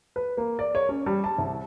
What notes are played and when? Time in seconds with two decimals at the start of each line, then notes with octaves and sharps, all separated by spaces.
0.16 B4
0.37 A#3
0.59 D5
0.75 C#5
0.89 C#4
1.06 G3
1.24 A5
1.38 C2